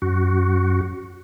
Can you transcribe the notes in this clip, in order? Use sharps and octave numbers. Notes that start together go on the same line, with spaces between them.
F#2 F#4